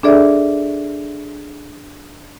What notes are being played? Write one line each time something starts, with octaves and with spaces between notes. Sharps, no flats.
D4 G#4 A4 D5 E5